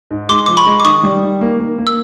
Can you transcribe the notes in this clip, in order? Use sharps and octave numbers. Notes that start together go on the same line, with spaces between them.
G#2
G#3 C6 D6
F3 D6
B5 C#6
G#3
D6
D#3 C#6 D#6
G3
D#3
A#3
A#3
A#3
E6